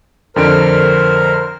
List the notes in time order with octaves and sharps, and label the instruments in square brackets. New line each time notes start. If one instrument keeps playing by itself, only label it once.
[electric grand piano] F2 D3 D7 [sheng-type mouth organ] A#4 C5 F6